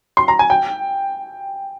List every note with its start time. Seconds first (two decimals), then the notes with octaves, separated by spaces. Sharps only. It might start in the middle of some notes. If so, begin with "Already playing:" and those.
0.17 C6
0.28 A#5
0.39 G#5
0.50 G5